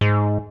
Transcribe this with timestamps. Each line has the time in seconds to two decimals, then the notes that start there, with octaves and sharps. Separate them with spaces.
0.01 G#2